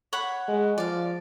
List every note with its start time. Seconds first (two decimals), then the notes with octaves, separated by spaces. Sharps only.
0.13 C#5 F#5 B5
0.48 G#3
0.78 F3 D5 F5